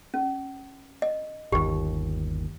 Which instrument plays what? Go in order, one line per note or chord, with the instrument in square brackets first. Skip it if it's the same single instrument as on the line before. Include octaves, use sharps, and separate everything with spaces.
[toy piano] C#4
D#5
[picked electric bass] G1 D#2 [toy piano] G4